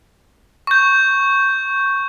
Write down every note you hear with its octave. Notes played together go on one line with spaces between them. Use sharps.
C#6 G6